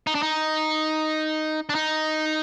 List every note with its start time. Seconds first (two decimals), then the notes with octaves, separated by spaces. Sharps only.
0.07 D#4
0.15 D4
0.22 D#4
1.69 D4
1.75 D#4